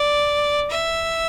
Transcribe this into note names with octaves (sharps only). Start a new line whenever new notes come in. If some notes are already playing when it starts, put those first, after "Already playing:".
Already playing: D5
E5